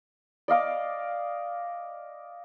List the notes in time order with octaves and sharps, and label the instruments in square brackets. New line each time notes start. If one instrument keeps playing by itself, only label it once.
[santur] D5 D#5 F5 D6